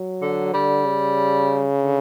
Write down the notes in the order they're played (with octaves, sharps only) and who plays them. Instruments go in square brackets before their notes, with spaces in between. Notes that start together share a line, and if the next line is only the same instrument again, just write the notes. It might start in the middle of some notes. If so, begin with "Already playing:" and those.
Already playing: [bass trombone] F#3
[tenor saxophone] D3
[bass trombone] D3 [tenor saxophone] G3
[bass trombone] C#3
[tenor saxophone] D3